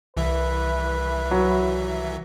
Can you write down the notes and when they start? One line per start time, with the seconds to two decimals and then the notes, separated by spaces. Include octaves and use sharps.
0.17 C2 E3 B4 E5
1.31 F#3